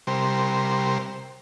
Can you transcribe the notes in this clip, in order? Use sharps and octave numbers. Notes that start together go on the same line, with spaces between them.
C3 G3 A#4 C5